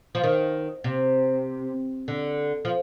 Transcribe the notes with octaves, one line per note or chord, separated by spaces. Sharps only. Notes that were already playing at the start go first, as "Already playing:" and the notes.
F3
D#3
C3
D3
F3